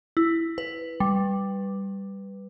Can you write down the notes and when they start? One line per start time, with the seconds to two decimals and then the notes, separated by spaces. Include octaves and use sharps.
0.17 E4
0.58 B4
1.00 G3